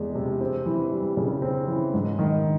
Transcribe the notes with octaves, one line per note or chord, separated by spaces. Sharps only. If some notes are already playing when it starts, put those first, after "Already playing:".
Already playing: E2 C3 G#3
C3
C4
E3
G3
C#3
C4
E3
G#2
D#3